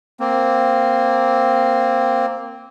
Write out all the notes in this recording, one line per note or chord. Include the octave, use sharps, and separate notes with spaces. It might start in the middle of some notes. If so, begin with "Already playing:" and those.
A#3 C4